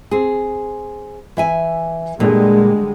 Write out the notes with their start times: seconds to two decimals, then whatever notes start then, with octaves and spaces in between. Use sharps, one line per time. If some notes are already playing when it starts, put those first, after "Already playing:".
0.11 C4 G#4
1.37 E3 E5 G#5
2.20 A#2 D3 G3 G#3